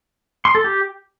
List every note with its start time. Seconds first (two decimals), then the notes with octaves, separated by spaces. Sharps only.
0.45 C6
0.55 A4
0.64 G4